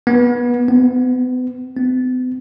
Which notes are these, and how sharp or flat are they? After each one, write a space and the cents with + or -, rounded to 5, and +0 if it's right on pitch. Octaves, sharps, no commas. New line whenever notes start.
B3 -25
B3 +35
B3 +45